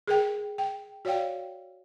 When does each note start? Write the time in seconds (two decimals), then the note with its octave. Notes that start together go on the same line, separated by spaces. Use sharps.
0.07 G#4 A#4 G5
0.58 G5
1.05 F#4 C#5 D5 F5 G5